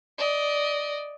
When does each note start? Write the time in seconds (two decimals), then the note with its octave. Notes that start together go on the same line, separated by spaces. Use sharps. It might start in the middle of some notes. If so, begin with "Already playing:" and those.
0.18 D5 D#5